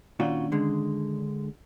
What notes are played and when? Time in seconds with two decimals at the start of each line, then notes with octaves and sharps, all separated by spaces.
0.20 A#2 D#3 C#4 D4 F4 F#4
0.52 D3 G#3